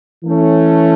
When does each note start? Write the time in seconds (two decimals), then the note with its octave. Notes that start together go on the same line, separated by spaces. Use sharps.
0.24 E3 A3 C#4